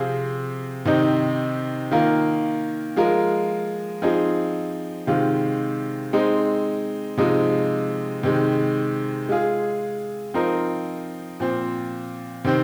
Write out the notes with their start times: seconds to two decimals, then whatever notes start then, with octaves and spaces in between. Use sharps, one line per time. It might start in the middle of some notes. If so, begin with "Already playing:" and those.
Already playing: C3 F3 C4 F4 G#4
0.86 C3 D#3 C4 D#4
1.91 D#3 A#3 F4 A#4
2.96 F3 G#3 F4 A#4
4.02 F3 C4 D#4 G#4
5.07 C3 D#3 G#3 F4
6.13 G#3 C4 D#4
7.18 C3 F3 G#3 D#4
8.23 C3 D#3 G#3
9.29 G#3 F4 G#4
10.34 F3 C4 D#4 A#4
11.40 A#2 F3 C4
12.45 C3 D#3 C4